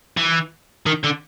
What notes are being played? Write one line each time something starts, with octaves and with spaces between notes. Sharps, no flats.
E3
D#3
D3